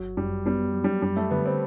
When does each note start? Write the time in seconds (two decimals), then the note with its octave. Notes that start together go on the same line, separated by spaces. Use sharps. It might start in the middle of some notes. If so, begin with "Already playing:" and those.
Already playing: G1 F#3
0.17 F#2 G3
0.46 G3 B3
0.74 F#3
0.84 G3
1.02 F#2 G3
1.17 A3
1.31 D3 B3
1.46 C4